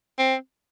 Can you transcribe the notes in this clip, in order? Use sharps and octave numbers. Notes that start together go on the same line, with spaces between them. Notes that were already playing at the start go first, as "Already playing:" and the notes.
C4